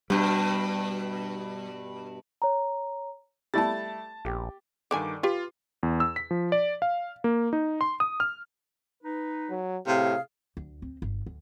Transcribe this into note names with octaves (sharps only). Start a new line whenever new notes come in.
G2 B2 G3
C#5 A#5
G3 A3 E4 A5 A6
A#1 G4
G2 D3 D#3 D4 G#5 D6
F4 G4 B4
E2
E6
B6
F3
D5
F5
A#3
D#4
C6
D#6
F6
D#4 B4
F#3
A2 C3 G#4 F5
D2
C4
G1
D2